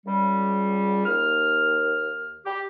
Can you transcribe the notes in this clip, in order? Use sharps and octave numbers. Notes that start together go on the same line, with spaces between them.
C#2 G3
D#2 F6
G4